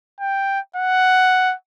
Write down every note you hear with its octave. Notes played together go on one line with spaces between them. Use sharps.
G5
F#5